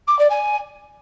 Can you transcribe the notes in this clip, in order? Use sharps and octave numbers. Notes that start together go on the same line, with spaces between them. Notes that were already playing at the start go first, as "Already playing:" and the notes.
D6
D5
G#5